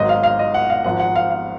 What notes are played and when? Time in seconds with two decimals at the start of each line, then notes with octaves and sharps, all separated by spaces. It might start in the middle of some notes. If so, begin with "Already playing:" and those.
Already playing: G#1 G#2 F#3 D#5
0.09 F5
0.23 F5
0.39 D#5
0.54 F#5
0.70 F5
0.84 G#1 G#2 F3 F#5
0.99 F#5
1.16 F5
1.31 F5